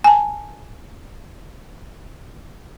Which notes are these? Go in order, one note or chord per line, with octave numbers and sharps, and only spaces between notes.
G#5 A5